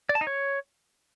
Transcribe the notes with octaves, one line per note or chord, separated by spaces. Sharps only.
D5
A5
D#4
C#5